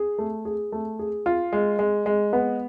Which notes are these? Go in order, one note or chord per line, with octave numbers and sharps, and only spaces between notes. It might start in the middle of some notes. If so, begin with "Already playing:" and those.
Already playing: G#4
A3
G#4
A3
G#4
F4
G#3
G#3
G#3
B3